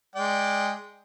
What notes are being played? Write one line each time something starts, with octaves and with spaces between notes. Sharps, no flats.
G#3 D5 G5